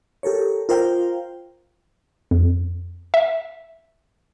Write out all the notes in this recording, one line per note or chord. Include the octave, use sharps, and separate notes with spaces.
G4 A4 A#4 C#5
F4 A#4 C5 F5 G5
F2
E5